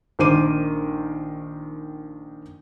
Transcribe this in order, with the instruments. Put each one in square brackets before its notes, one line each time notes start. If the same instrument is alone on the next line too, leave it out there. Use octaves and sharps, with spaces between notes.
[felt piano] A#1 D#3 C5 D6 D#7